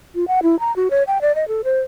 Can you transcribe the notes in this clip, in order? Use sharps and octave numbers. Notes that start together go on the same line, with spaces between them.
F4
F#5
E4
A#5
F#4
C#5
G5
D5
D#5
A4
C5